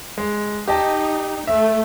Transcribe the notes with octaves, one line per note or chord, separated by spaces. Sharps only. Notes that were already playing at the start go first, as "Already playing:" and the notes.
G#3
D#4 G4 D#5 A5
A3 E5